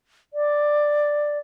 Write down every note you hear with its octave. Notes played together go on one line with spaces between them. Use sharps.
D5